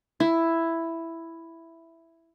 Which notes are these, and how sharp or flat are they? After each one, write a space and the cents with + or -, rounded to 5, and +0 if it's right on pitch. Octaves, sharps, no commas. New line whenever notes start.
E4 +5